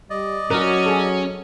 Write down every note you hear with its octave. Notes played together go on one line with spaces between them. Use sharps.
G3 D5 D#5
F#3 C#4 F#4 A#4
G#4 A4